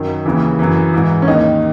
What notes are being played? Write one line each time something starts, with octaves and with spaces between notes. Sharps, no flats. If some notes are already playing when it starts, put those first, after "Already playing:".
Already playing: F#2 D#3
D#2 C#3 E3
F#2 E3
G#2 E3
C#4
D#2 D#3 D#4